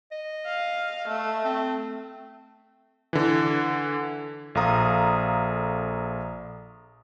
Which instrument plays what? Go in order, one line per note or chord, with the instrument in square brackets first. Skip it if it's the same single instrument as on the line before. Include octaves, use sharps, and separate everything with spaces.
[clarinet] D#5
[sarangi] F5
A3
[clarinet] C4
[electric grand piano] D3 E3
A#1 A4 F5 A#5 D#6